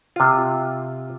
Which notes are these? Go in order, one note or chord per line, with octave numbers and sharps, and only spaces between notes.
C3 F4